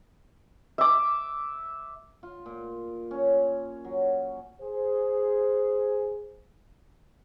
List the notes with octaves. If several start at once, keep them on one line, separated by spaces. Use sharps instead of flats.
E5 D6
F4
A#2
C#4
F#3
G#4 C5